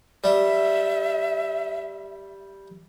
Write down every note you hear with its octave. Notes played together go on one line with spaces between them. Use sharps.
G3 E5